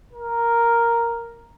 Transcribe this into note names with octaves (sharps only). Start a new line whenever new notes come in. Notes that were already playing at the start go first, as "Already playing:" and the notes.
A#4